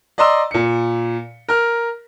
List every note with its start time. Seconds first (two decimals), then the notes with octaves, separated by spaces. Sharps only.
0.18 D5 D#5 A#5 C6 D#6 E6
0.51 A#2 C#7
1.49 A#4 F6